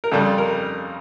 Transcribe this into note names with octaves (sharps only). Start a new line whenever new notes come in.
A#4
F2 C#3 G3 A4
A#4